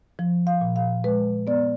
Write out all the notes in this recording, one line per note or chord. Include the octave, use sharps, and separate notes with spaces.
F3
F5
A#2
F5
G#3 B4
B3 D5